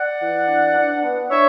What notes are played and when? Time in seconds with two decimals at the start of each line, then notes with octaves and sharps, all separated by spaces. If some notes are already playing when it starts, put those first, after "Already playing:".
Already playing: D5 F#5
0.20 E3
0.47 D4
0.76 D4
1.03 B3
1.30 D4 C#5 E5